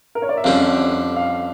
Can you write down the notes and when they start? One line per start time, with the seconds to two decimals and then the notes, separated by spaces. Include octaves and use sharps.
0.15 A#4
0.22 C#5
0.29 D5
0.37 E5
0.44 F2 D3 G3 C#4 F5
1.16 F5